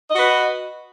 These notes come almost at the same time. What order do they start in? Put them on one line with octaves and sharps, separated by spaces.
D#5 F#4 B4